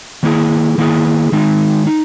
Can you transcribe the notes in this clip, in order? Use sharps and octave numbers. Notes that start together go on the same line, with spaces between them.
D#3 A#3 E4 G#4
D#3 A#3 E4 G#4
D#3 G#3 D#4
D#4